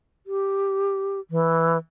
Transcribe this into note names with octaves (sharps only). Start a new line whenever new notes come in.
G4
E3